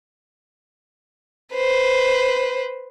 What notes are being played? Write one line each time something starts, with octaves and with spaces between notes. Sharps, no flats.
B4 C5